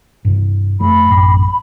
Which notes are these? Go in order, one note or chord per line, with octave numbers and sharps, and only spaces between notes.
G2 C3
F2 A3 B5
A1 F#2